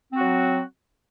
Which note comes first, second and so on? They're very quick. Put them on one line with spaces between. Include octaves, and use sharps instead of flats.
C4 F#4 F#3